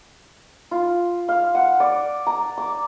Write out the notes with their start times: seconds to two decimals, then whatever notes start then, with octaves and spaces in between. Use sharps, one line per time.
0.71 F4
1.28 F5
1.55 F#5
1.80 D5
2.27 A#5
2.58 D6